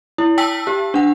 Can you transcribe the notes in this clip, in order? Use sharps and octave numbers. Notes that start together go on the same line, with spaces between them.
E4
G5 A5 E6 B6
G4
D4 F#5